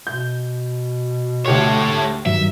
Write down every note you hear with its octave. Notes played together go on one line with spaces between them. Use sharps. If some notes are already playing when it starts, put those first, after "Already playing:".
B2 G6
D2 A3 G4 C#5 C#7
G2 D#3 F#3 E5